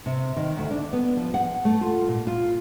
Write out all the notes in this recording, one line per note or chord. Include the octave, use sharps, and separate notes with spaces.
C3
D#3
D2
D4
B3
F3
F#5
A3
F4
A#2
F4